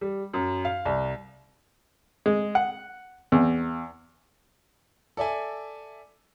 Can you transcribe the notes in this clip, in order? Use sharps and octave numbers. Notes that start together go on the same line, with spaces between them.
G3
F#2
F5
C2
G#3
F#5
E2
A4 D5 E5 G#5